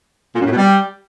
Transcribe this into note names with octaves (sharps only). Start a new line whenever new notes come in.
A#2
F#2
A2
B2
G3